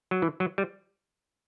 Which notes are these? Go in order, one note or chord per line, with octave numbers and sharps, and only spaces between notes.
F#3
E3
F#3
G3